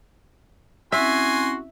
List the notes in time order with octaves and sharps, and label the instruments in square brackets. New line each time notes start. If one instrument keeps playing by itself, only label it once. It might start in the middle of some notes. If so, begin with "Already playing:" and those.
[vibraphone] C4 C#4 E4 [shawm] F#4 [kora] E5 [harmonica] G#5 C6